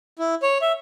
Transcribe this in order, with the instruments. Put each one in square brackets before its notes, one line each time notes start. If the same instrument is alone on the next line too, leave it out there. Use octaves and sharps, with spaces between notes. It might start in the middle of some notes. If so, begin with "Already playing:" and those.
[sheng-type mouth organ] E4
C#5
E5